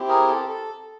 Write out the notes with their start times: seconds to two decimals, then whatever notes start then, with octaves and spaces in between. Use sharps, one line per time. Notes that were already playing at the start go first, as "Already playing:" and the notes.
Already playing: C4 E4 G4
0.09 G#4 A#4
0.29 A4
0.49 A4